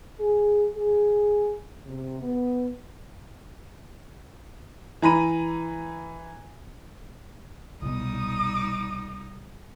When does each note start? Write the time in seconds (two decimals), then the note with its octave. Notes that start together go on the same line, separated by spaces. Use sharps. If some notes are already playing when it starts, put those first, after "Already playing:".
0.20 G#4
0.76 G#4
1.86 C3
2.20 B3
5.02 E3 A#5 B5 D#7
7.82 C2 B2 G3 D#4 D#6